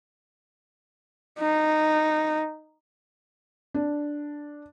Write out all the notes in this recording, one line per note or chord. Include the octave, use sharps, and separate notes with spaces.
D#4
D4